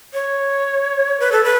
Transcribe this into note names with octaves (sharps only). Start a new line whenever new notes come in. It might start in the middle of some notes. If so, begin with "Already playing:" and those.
C#5
B4
A4
B4